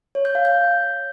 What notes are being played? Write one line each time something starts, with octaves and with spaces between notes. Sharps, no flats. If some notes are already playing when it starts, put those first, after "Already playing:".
C#5
G6
F5
G6